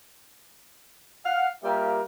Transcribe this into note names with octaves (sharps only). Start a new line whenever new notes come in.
F5 F#5
G3 A#3 F4 G4 A#4 E5